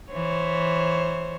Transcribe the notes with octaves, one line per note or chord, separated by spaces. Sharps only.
E3 C5 C#5